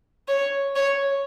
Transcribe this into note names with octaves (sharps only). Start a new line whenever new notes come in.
C#5
C#5